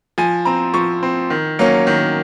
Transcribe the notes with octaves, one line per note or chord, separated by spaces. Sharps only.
F3 G#5
C4 A#5
F3 C#6
C4
D#3
F#3 A#3 C#4
D#3